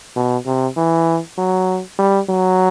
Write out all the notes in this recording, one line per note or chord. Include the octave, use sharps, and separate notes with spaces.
B2
C3
E3
F#3
G3
F#3